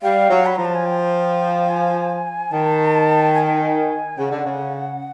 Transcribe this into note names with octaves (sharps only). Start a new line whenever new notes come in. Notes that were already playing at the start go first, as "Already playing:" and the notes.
G3 F5
F#3
B5
F3 A#5
A5
G#5
G5
G#5
D#3 A5
G#5
A5
G#5
C#3 F#5
D3
C#3